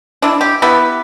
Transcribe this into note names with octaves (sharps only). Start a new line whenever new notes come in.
D4 E4
G4
B3 E4 G4 B4